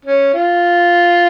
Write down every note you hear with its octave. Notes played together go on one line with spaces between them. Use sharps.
C#4
F4